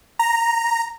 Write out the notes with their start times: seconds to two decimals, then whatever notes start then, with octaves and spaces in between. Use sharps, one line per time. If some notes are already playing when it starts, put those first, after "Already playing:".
0.19 A#5